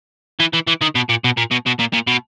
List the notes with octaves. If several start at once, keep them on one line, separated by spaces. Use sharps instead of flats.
E3
E3
E3
D#3
B2
A#2
B2
A#2
B2
B2
A#2
A#2
B2